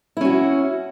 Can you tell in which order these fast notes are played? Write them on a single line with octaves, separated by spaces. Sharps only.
E4 C#4 F#4